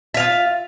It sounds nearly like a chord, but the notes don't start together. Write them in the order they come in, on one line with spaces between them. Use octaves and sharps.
E5 F5 F4